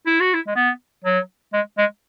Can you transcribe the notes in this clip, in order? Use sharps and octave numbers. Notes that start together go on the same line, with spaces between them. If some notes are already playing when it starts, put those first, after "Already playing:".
E4
F#4
E4
G#3
B3
F#3
G#3
G#3